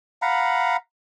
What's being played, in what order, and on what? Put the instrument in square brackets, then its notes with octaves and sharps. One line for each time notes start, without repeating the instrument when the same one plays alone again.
[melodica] F5 F#5 A#5 B5